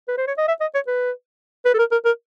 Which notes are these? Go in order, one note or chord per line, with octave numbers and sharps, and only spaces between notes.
B4
C5
C#5
D#5
E5
D#5
C#5
B4
B4
A4
A#4
A#4
A#4